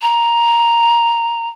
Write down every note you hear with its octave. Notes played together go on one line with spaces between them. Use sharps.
A#5